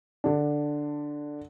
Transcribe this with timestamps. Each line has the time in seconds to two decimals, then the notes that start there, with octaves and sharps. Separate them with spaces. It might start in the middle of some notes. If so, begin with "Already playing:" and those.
0.24 D3 D4